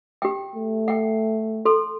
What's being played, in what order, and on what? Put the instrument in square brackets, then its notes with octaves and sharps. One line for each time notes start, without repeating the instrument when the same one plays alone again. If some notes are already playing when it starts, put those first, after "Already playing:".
[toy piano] G4 G5
[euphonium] A3
[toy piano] F#5 G5
A4 C6